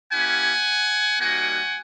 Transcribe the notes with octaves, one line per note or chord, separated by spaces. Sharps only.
A#3 C#4 E4 G4 F#5 G#5
G3 A#3 D#4 F#4 F#5 G#5